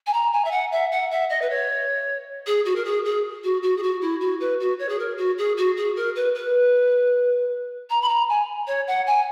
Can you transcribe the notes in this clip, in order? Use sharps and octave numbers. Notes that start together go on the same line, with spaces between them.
G#5
A#5
G#5
E5
F#5
E5
F#5
E5
D#5
B4
C#5
G#4
F#4
A#4
G#4
G#4
F#4
F#4
G#4
F#4
E4
F#4
B4
F#4
C#5
G#4
A#4
F#4
G#4
F#4
G#4
A#4
B4
B4
A#5
B5
A#5
G#5
C#5
F#5
G#5